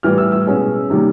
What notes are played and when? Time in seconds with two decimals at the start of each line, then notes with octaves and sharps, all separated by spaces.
0.03 A2 E3 G3 F6
0.18 E6
0.32 E6
0.47 B2 G#3 C#4
0.90 C3 D#3 G3 A#3